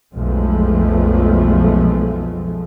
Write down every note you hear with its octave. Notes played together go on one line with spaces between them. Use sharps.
B1 F2 F3 G#3 A3